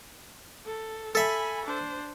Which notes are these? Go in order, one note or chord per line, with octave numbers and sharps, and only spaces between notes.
A4
A4 E5 G#5 B5
D4 C5